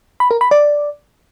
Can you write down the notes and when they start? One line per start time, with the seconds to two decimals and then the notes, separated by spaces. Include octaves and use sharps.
0.20 B5
0.31 A#4
0.41 B5
0.51 D5